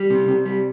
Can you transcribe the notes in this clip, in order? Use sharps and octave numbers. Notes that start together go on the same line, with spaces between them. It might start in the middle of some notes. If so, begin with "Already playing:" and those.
Already playing: G3
C3
C3
G3